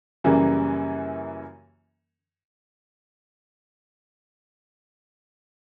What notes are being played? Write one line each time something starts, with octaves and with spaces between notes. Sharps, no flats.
F#2 C#3 E3 G3 A#3